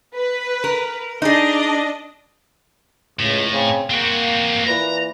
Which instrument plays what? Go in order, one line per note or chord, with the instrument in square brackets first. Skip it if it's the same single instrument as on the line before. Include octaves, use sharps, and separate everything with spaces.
[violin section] B4
[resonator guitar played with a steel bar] A#4
[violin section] D4 D#5 [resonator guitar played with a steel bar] D#4 G#4
[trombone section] C#2 [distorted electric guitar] A2
[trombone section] C#3 C4
[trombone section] A#3 [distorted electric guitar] C4 F#4
[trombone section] A#2 E3 B4 [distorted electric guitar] A#5